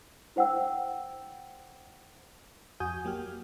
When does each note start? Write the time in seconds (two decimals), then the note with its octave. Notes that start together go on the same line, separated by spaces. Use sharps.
0.36 E4 C5 F#5 G5 E6
2.80 F2 F#4 G#5 D#6 G6
3.05 F#3 A#3 G4 F6